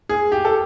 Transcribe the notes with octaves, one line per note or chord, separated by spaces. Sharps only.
G#4
G4
A4